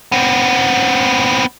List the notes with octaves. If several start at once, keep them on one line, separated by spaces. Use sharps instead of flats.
B3 C4